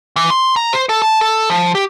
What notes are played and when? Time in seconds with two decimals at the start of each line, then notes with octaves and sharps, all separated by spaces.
0.16 E3
0.30 C6
0.56 A#5
0.73 C5
0.89 A4
1.02 A5
1.21 A4
1.50 F3
1.75 G4